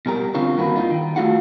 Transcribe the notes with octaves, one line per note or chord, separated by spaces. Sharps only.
B2 G3 A#4
D3 C4 C#4 F4 C#5
G2 D#3 A#3 F#4 B4
D#4 F4
D#3
A3 F4 F#4 F5 F#5